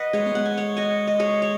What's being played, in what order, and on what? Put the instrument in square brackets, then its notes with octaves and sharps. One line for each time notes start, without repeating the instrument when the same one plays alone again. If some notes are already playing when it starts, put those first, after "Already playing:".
Already playing: [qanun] B4 D#5 F#5
[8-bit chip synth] G#3 [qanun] G#4 C#5
[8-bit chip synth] B3
[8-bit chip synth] G#3 [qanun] F#5
[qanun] G#5
C#5 F#5
D#5 G#5
D#5
G#4 C#5
C#5